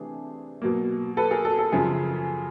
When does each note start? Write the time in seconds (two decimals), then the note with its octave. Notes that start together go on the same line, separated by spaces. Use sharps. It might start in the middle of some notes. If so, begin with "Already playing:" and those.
Already playing: C3 E3 A3 D4 G#4
0.62 B2 F#3 A#3
1.17 A4 B4
1.31 G#4 A#4
1.45 A4
1.59 A4
1.72 F#2 C#3 F3 G#4